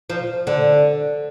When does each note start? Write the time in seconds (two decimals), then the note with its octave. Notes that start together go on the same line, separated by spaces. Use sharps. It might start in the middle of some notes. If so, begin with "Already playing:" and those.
0.10 F3
0.47 D3